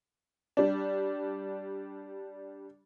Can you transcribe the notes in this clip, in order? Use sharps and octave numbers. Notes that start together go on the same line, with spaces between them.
G3 D4